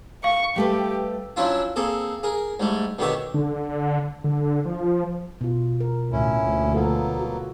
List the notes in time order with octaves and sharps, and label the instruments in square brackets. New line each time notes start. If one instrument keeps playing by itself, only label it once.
[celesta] F5 [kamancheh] C#6
[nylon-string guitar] G3 A3 B4 [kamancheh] G4
[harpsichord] F3 F#3 C#4 D4 E4 F4
A#3 C4 G#4 A4
G#4 A#4
G#2 G3 A3
B2 D3 D#3 G4 C#5 E5
[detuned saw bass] D3
D3
F3
[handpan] B2 F4
A#4
[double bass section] D2 A2 [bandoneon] C#4 E4
[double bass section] D2 A#2
[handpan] F3 F4 A4 [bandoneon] F#3 A#3 B3
[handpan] F#4